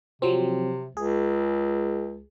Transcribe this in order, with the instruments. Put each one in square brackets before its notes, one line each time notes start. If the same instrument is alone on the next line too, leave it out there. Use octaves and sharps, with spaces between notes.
[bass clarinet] C3 [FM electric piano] F3 F#3 C4
[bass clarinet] C#2 [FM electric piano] G#4